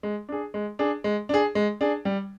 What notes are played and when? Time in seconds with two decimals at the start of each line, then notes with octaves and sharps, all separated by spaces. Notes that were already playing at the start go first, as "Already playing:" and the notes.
0.03 G#3
0.29 D4 G#4
0.54 G#3
0.79 D4 G#4
1.04 G#3
1.29 D4 G#4
1.55 G#3
1.81 D4 G#4
2.05 G3